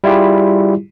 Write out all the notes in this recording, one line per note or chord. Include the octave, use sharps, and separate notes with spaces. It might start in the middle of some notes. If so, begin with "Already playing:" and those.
G3 E4 F4 G4 G#4